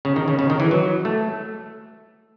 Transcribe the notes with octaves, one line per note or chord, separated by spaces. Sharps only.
C#3
D#3
C#3
C#3
D#3
E3
F#3
A3